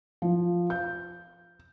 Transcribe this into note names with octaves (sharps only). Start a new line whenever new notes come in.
F3
G6